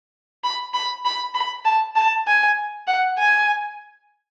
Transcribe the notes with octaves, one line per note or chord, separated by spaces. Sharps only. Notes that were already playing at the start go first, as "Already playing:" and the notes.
B5
B5
B5
B5
A5
A5
G#5
F#5
G#5